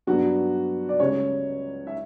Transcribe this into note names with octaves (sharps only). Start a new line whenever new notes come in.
G2 F#3 B3 D4 F#4
D5
C#2 C#3 G3 C#5
E5